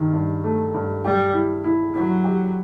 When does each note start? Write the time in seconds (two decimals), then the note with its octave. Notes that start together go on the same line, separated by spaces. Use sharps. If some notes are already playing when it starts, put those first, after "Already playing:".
Already playing: G2 D#3
0.13 G2
0.44 A3
0.74 G2
1.04 G3 G4
1.33 E4
1.64 E4
1.94 F#3 E4
2.24 G4